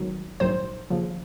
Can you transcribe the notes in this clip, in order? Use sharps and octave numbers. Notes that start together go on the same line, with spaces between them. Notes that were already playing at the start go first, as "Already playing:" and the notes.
Already playing: G#1 G#2 D#3 F#3
A#1 G#2 D#3 F#3 C5
D#2 C#3 F3